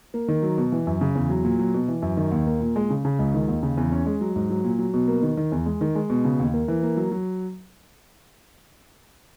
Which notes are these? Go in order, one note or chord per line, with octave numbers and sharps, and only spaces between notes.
A#3
D#3
F#3
B2
E3
F#2
C#3
E2
F#3
A#2
F#3
B2
E3
F#2
D#3
D#2
A#3
A#2
G#3
C#3
C#3
C#2
D#3
D#2
C#3
E2
C#4
G#3
F#3
G#2
F#3
A#2
F#3
B2
A#3
D#3
D#3
E2
G#3
D#3
G#3
B2
C#3
D#2
A#3
E3
A#3
F#3
F#3